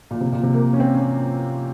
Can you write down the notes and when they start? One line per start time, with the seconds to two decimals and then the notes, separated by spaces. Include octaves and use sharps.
0.11 A#2
0.21 C3
0.32 A#2
0.43 C3
0.54 A#3
0.73 C#4
0.80 C4
0.94 C#4